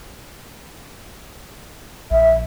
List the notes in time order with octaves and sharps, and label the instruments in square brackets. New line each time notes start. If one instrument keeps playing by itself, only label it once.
[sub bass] A#1 [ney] E5